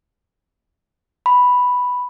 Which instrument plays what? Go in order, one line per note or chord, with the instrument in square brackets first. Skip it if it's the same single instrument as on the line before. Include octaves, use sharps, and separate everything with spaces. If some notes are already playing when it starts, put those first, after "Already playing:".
[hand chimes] B5